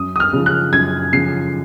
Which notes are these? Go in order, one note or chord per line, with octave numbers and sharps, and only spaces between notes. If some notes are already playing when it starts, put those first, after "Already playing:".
Already playing: F#2 D#6
D#6
F6
C#3 F3
F#6
F#2 G#6
C#3 F3 C7